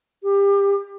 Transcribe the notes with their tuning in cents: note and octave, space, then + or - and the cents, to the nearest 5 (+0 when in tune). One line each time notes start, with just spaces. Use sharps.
G4 +25